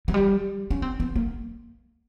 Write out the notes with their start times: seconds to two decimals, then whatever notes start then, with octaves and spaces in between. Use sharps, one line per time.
0.08 F#3
0.14 G3
0.70 C#4
0.82 C4
1.00 B3
1.16 A#3